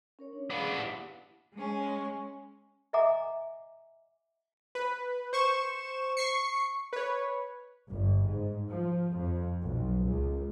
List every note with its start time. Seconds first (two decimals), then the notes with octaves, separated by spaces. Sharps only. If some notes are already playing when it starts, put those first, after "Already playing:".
0.19 C#4 A#4 C#5
0.33 C#4 D4
0.50 B3 D4 G#4 F5 B5
0.62 C6
0.77 E4 G4 E5
1.54 G#3 C#4
2.93 D#5 E5 F#5 G#5 A#5 D6
4.75 B4
5.33 C5 C#6 E7
6.17 C#6 C7 C#7
6.93 B4 C#5
7.89 G1
8.24 G#2
8.68 F3
9.14 F2
9.61 B1
10.06 C#2